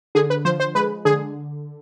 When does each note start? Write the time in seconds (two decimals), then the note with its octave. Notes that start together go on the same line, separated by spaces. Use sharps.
0.15 D3 G#4
0.30 B4
0.45 F3 C5
0.60 C5
0.75 G#3 B4
1.05 D3 G#4